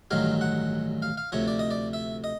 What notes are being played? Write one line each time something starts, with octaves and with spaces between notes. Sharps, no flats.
A1 G2 D#3 F#3 F5
F#5
F5
F5
D2 C3 F3 C#5
D5
D#5
D5
E5
D#5